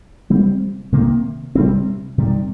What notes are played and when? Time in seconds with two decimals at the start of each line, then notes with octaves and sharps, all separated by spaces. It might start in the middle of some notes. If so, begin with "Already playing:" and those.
0.30 C3 G3 C4
0.92 C3 D#3 A#3
1.55 C3 G3 C4
2.18 C3 D#3 G3